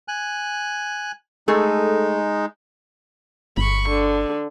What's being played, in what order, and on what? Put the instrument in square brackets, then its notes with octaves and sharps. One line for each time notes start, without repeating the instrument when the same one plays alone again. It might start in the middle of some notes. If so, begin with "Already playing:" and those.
[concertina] G#5 F#6
[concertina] G#3 D#4 [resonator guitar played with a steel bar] A3 G#4 A4
[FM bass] G1 [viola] B5 C#6
[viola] D3